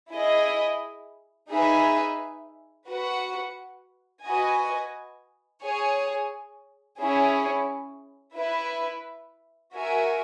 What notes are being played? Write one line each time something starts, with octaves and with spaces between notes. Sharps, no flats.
E4 G#4 D#5
D#4 G#4 B4 E5 G#5
F#4 B4 F#5
F#4 B4 D#5 G#5
G#4 C#5 G#5
C#4 E4 G#4 C#5
E4 B4 E5
F#4 A#4 E5 G#5